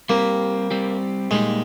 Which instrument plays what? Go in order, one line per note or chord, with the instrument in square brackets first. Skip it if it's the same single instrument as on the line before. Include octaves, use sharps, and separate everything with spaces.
[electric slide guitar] G3 C4 G4 [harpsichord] A#3
[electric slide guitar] G3 C4 G4
[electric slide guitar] A#2 G3 A#3 D#4 G4 [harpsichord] G#3